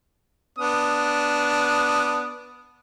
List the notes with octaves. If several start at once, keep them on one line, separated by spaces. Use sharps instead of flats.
B3 D4 D#6